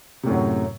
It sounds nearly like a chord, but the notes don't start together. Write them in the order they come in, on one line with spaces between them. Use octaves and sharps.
C3 A2 F#2 F#3